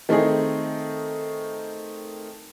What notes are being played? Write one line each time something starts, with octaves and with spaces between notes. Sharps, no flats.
D#3 A3 C4 D#4 G#4